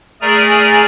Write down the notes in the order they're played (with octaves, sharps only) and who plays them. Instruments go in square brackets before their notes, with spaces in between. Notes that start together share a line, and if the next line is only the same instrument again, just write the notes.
[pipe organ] A3 G#4 A#4 D5 G#5 A#5